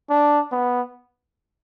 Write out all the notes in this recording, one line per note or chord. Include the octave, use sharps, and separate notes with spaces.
D4
B3